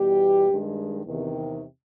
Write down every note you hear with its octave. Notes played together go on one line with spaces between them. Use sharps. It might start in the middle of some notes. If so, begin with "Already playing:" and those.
Already playing: E2 B2 G3 G4
G2 D#3 G#3
E2 C3 D#3